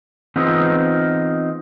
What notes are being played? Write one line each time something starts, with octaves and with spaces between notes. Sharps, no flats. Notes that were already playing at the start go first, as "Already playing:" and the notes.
E3 B3 C4 D#4 F4 G#4